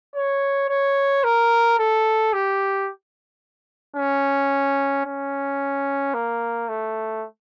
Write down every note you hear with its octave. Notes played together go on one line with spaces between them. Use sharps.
C#5
C#5
A#4
A4
G4
C#4
C#4
A#3
A3